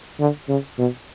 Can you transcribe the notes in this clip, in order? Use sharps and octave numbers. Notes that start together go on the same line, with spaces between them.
D3
C#3
B2